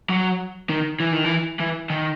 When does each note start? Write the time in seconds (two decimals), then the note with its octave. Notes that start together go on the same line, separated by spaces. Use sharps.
0.10 F#3
0.69 D#3
1.00 E3
1.13 D#3
1.25 E3
1.60 E3
1.90 D#3